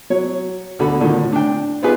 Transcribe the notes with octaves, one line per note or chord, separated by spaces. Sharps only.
F#3 C#5
D2 B2 D3 A4 B5
A#2 D3 D#3
A2
D4 G5
B3 D#4 F4 G4 G#4 B4